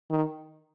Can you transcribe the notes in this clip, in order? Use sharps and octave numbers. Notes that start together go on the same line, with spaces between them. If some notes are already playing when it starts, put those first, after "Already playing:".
D#3